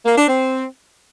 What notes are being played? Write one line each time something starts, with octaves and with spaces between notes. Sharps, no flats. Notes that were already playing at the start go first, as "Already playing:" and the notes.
A#3
D4
C4